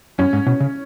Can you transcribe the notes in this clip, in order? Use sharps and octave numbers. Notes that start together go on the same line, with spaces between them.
F#2 C#4
G#2
B2 C#4
C#3